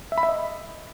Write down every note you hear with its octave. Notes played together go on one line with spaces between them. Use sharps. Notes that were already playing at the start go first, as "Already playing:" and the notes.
E5
B5
E5
D#5